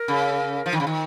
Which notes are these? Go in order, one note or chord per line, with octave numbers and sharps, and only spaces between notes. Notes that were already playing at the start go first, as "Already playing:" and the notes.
Already playing: A#4
C#3
F3
D#3
C#3
D#3